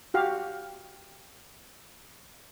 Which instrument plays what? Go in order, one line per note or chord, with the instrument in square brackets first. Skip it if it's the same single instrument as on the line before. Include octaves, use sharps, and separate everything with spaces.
[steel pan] F#4 G4 F5